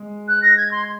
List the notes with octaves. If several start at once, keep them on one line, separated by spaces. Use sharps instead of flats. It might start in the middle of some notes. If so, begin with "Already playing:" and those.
Already playing: G#3
F#6
A#6
G#6
C6